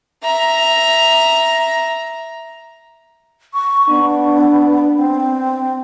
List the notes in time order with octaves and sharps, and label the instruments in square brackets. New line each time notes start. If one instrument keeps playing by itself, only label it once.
[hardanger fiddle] E5 A#5
[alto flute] C#6
[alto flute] B3 [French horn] D4
[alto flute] C4